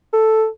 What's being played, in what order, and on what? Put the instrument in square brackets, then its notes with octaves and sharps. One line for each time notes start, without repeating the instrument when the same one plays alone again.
[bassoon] A4